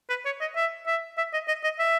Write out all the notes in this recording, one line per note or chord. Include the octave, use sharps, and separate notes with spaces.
B4
C#5
D#5
E5
E5
E5
D#5
D#5
D#5
E5